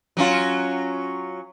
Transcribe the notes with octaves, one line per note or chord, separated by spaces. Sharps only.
F#3 C#4 F4